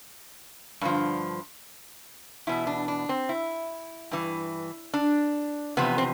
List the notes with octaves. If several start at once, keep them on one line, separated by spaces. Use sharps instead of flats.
G2 D3 F3
E2 B2 E4
D4
D4
C4
E4
G2 E3
D4
E2 C3 F3 B3
C4